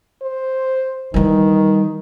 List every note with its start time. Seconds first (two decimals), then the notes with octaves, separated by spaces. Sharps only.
0.22 C5
1.14 D#3 E3 G3